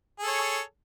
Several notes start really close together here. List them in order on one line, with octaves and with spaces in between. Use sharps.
G#4 A4 C#5